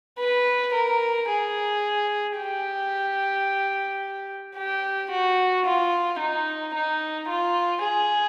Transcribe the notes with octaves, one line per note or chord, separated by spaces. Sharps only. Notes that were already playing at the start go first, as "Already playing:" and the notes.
B4
A#4
G#4
G4
G4
F#4
F4
D#4
D#4
F4
G#4